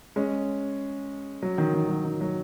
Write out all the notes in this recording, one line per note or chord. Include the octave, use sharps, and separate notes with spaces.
G#3 C#4
F#3
D#3
D#3
F#3
D#3
F#3